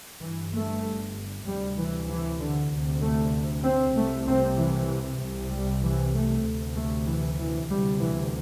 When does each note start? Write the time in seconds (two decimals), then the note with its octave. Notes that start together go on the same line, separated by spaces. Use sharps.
0.21 G1 G2 E3
0.52 A3
1.45 D2 C3 G3
1.77 E3
2.08 E3
2.39 D3
2.71 D2 C3
3.02 A3
3.64 C4
3.95 C2 C3 A3
4.27 C4
4.58 E3
5.20 C2 C3
5.51 G3
5.83 E3
6.14 A3
6.45 D2 C3
6.76 A3
7.08 E3
7.39 E3
7.69 D2 C3 G3
8.01 E3